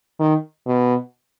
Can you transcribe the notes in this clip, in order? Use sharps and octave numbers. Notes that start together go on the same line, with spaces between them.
D#3
B2